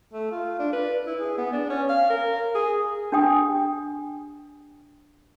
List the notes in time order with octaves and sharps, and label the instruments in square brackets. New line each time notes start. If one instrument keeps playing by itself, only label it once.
[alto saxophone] A3
F4
D4
B4
E4
G#4
B3
D4
C#4
F5
A#4
G#4
[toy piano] D4 G4 G5 D#6